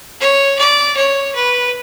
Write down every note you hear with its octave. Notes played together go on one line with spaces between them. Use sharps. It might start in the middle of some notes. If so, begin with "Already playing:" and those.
C#5
D5
C#5
B4